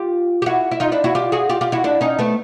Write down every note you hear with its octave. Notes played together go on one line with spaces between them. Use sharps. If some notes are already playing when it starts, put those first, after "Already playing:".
Already playing: F4 G4
G4
E4 F#4
E4
D#4 F4
D4 E4
E4 F#4
F4 G4
F#4 G#4
F4 G4
F4 G4
E4 F#4
D4 E4
C#4 D#4
A3 B3